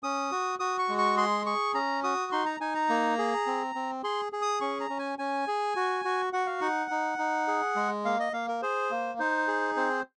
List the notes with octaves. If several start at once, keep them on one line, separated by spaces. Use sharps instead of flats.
C#4 D#6
F#4
F#4 D#6
C#6
G#3
C#6
G#4 C6
G#4 C#6
C#4 A#5
F#4 D#6
D#4 C6
A#5
D#4 G#5
A#5
A#3
G#4
C4
C4
G#4 C6
G#4
D#6
C#4 C#6
A#5
C#4
G#5
C#4 G#5
G#4
F#4
F#4
F#4 F#5
F5
D#4 F#5
D#4
D#4
G#4
G#3
A#3 F5
D#5
A#3 F5
A#4
G#4 C5
A#3
D#4 C5
G#4
C4 C5